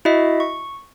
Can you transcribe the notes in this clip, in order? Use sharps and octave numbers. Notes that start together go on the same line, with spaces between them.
E4 F#4 D#5 E5
C#6